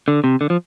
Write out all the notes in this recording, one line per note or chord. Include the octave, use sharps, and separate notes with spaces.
D3
C3
D3
F3